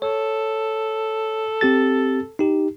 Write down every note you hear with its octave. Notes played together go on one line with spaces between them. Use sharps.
A4 C#5
C4 G4 A6
D#4 G4